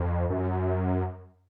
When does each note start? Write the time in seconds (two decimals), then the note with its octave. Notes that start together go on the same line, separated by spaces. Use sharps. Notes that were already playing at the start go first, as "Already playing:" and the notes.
Already playing: F2
0.30 F#2